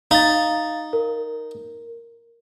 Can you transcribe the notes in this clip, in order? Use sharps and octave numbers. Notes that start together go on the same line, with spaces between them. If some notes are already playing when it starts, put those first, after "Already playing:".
D#4 F5 A6
A#4